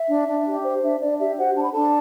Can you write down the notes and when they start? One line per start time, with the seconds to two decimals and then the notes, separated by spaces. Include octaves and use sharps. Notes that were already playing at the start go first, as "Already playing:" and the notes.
Already playing: E5
0.09 D4
0.28 D4
0.46 G4
0.64 C5
0.83 D4 E5
1.01 D4 D5
1.19 G4 E5
1.38 F#4 C5 F#5
1.56 D4 A5
1.64 B5
1.72 D4 A4 A5